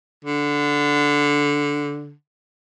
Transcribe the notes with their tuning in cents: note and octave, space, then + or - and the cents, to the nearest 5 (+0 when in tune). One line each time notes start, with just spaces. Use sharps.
D3 -10